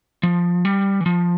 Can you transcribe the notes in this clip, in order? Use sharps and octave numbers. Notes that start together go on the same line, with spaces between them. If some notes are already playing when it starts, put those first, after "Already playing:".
F3
G3
E3
F3